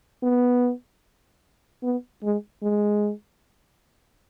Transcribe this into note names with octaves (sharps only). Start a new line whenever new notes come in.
B3
B3
G#3
G#3